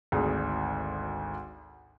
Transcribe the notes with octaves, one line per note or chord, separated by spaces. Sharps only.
G#1 D2 G#4